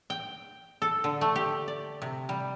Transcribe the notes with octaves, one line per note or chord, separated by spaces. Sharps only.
G5
A4
D3
A3
G4
D5
C3
G3